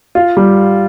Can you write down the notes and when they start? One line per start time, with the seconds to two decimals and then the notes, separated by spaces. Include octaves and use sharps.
0.15 F4
0.37 G3